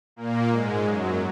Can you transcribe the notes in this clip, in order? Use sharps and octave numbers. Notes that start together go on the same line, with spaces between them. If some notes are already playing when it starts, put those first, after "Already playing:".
A#2 A#3
G#2 G#3
F#2 F#3